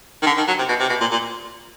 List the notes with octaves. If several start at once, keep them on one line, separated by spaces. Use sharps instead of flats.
D#3
D3
D#3
F#3
C3
B2
C3
B2
A#2
A#2